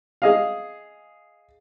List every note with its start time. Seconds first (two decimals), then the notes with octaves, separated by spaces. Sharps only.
0.22 G#4 D#5 F5